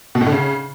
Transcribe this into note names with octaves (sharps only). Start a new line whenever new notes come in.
B2
A2
D3
C#3